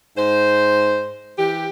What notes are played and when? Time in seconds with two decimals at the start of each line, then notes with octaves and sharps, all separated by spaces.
0.17 G#2 C5
1.37 E3 G4